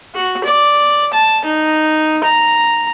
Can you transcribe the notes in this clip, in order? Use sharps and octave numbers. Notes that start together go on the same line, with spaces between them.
F#4
D5
A5
D#4
A#5